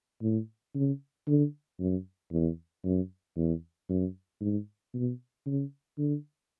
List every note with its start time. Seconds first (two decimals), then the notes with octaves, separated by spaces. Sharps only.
0.21 A2
0.75 C#3
1.27 D3
1.79 F#2
2.32 E2
2.84 F#2
3.36 E2
3.89 F#2
4.41 G#2
4.94 B2
5.46 C#3
5.98 D3